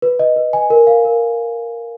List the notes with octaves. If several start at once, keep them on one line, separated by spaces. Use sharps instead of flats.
B4
D#5
B4
G#5
A#4
F5
A#4